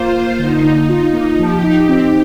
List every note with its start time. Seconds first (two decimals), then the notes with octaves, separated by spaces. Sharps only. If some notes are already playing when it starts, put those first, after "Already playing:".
Already playing: A#3 F4 C5
0.15 A#3
0.38 D3 D#4
0.64 D3
0.89 F4
1.13 A#3
1.39 F3 G4
1.63 D#4
1.89 C4